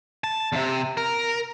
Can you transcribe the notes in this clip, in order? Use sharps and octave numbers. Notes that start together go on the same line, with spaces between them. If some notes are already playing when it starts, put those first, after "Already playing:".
A5
E2 C3
A#4